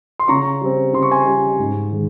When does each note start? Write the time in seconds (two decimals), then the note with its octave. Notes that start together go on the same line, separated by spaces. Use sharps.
0.19 C6
0.28 C#3 A#5 C#6
0.61 G3 C4
0.93 C#3 C6
1.03 C#6
1.11 G#5 C6
1.26 G3 C4
1.59 G#2
1.91 D#3 G#3